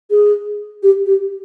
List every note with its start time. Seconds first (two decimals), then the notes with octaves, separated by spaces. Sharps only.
0.11 G#4
0.83 G4
1.06 G4